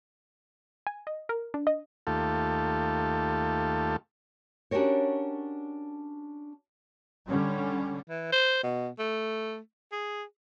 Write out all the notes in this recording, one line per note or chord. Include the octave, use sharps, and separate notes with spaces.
G#5
D#5
A#4
D4
D#5
D#2 A3 F4 G4 A4
C#4 D4 F#4 G4 A#4 C#5
D3 G3 C#4
E3
C5
B2
A3
G#4